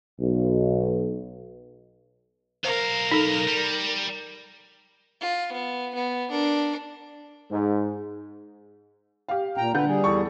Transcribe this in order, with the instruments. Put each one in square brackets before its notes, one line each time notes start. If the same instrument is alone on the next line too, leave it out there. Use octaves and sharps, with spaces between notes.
[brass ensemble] B1
[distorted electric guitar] B1 F5 [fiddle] A#4 [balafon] C5
[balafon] D#4 A4
[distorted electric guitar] G3
[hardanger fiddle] F4
B3
B3
D4 A#4
[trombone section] G#2
[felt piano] G4 F5
[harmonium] A#2 G5 A#5
[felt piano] D3 F#5 G6 [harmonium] B4
[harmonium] G3 G#4
[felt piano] E2 A4 C#6